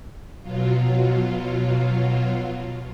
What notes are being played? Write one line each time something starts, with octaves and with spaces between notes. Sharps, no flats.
B2 F#3 F4